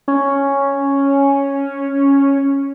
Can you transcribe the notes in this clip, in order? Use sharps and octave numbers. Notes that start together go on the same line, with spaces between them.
C#4